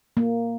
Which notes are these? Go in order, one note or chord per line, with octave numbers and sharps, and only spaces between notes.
A#3